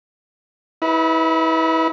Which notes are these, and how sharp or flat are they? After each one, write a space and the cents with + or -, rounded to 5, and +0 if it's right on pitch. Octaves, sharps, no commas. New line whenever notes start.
E4 -35 B4 +0